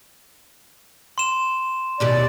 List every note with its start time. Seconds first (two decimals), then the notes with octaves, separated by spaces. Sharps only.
1.18 C6 E7
2.00 D#2 B2 G4 D5